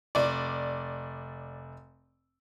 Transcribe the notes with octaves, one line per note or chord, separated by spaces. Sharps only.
F1 D5